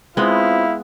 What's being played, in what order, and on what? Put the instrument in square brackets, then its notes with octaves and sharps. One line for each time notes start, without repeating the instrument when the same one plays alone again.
[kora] G#3 B3 [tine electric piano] C4 F4 C5 [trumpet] E4 [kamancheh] F5